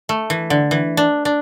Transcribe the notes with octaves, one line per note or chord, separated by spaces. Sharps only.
A3
E3
D3
E3
D4
D4